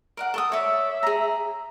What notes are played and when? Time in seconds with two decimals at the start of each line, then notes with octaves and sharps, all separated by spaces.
0.17 A#4 D5 F#5
0.34 A4 C#6 D#6
0.52 C#5 D5 E5
1.03 G#4 A#5